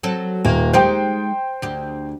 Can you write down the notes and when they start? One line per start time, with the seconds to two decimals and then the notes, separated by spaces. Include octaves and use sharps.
0.03 F#3 C4 A4
0.45 D#1 A#3
0.73 G#3 D#4 G4 C5 G5
1.62 D2 G4